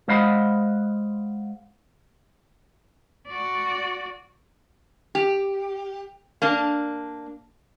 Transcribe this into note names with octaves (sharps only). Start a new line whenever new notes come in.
G#3 C5 D#5 F5 F#5 B5
F#4 D5
G4
A#3 D4